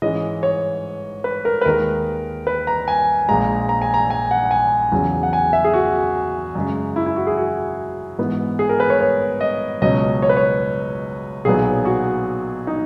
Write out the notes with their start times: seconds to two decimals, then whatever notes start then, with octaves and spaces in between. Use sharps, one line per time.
0.02 G#2 E3 G#3 C#4 D#5
0.43 C#5
1.24 B4
1.45 A#4
1.61 B4
1.65 D#2 D#3 G#3 A#4
2.47 B4
2.67 A#5
2.88 G#5
3.28 A#1 A#2 G#3 A#5
3.69 A#5
3.82 G#5
3.94 A#5
4.10 G#5
4.31 F#5
4.51 G#5
4.92 E2 C#3 F#3
5.23 F#5
5.33 G#5
5.53 E5
5.64 G#4
5.73 F#4
6.55 F#2 C#3 G#3
6.96 E4
7.06 E4
7.16 F#4
7.27 G#4
7.37 F#4
8.18 G#2 E3 B3
8.59 G#4
8.69 A#4
8.80 B4
8.90 C#5
9.00 C#5
9.41 D#5
9.82 C#2 B2 F#3 C#4 D#5
10.22 C#5
10.29 B4
10.37 C#5
11.45 B1 A#2 F#3 B3 G#4
11.85 F#4
12.67 D#4